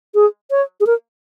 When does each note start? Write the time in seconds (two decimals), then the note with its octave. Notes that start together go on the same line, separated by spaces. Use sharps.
0.14 G#4
0.51 C#5
0.80 G#4
0.86 A#4